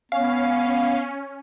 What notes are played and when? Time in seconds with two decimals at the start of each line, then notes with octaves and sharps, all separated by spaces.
0.12 B3 C#4 F5